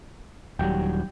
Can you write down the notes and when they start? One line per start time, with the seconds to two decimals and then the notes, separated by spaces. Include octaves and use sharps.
0.59 D#1 F#3 G3 G5